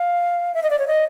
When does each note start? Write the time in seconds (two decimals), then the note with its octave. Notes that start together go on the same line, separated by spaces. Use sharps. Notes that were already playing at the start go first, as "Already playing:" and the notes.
Already playing: F5
0.54 E5
0.63 D#5
0.70 D5
0.79 C#5
0.87 D#5